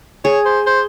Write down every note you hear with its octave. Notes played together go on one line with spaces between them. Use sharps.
G#4 C#5
C5
C5